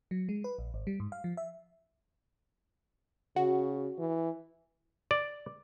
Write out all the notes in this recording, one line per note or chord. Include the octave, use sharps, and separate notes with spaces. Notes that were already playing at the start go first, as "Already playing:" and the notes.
F#3
G#3
B4
A#1
G#1
G3
G#2
F5
F3
E5
C#3 F#4
E3
D5